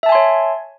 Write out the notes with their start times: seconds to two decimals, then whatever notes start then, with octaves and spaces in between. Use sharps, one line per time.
0.03 E5
0.06 A5
0.09 G#5
0.12 C6
0.15 C#5